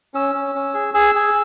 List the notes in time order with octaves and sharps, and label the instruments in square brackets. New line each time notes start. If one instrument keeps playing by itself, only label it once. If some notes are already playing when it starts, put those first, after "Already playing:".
[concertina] C#4 E6
C#4
C#4
G#4
G#4 E6
G#4